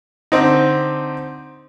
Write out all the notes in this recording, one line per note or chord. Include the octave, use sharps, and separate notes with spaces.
D3 C4 D#4